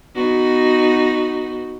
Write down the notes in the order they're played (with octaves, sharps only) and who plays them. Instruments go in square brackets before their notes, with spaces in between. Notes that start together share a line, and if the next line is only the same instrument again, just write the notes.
[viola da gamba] B3 D#4 F#4